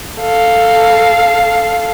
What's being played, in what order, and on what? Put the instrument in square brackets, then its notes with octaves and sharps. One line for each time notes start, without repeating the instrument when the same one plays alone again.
[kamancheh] A4 F5